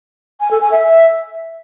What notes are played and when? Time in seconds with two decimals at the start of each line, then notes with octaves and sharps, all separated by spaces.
0.40 G#5
0.51 A4
0.61 G#5
0.72 E5